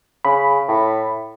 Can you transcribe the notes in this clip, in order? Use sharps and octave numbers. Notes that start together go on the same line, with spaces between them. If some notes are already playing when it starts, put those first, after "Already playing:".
C#3 B5
A2